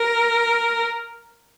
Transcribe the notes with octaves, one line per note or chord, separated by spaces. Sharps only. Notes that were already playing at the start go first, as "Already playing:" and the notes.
Already playing: A#4